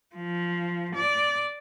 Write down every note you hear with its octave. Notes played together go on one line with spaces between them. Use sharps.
F3
D5